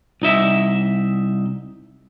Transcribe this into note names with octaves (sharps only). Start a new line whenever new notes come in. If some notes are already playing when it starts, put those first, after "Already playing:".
C2 D#4 E5